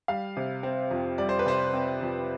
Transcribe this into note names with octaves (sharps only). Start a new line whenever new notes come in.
G3 F5
C3
C4
F2
G3 D5
C5
B4
C3 C5
C4
F2